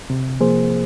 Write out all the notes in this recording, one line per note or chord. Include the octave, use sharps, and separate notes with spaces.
C3
F3 A#3 G#4 C5